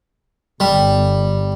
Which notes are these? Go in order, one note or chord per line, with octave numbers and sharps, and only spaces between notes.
G1 G3